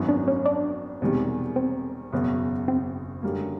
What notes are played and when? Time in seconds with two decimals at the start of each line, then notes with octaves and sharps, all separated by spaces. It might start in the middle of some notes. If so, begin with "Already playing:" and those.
Already playing: G#1 F#2 D#3 F#3 B3
0.09 D4
0.28 C#4
0.46 D4
1.01 E1 E2 C3 D#3 G3
1.56 C4
2.12 F#1 E2 B2 F#3
2.68 C4
3.23 F#2 D3 G3 A#3